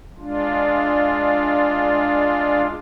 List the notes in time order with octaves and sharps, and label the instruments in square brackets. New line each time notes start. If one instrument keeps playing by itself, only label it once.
[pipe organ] G#3 D4 F4